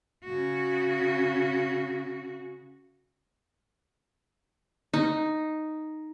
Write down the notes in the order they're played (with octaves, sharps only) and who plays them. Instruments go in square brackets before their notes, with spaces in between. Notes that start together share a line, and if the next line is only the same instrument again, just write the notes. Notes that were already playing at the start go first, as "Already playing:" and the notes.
[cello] C#3 F#4
[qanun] D#4